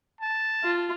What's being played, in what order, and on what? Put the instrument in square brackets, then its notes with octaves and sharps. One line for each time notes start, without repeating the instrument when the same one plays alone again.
[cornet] A5
[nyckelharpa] F4